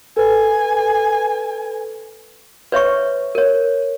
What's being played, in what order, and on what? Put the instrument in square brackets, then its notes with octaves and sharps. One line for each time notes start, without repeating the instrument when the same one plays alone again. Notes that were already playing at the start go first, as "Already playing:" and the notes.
[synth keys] A4 B4 [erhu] G#5
[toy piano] B4 C#5 E5 C#6
A#4 C#5